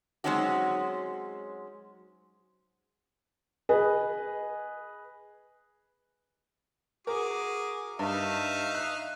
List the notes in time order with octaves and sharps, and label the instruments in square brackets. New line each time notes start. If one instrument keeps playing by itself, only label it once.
[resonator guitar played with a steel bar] F#3 G#3 C4 C#4 D#4 F#4
[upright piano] G#4 B4 D#5
[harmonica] F#4 G#4 D6 [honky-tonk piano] A#4
[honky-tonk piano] G2 [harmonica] D#4 E5 F5
[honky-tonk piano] F#6